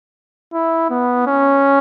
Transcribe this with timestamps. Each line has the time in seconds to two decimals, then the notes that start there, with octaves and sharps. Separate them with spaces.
0.53 E4
0.90 B3
1.27 C#4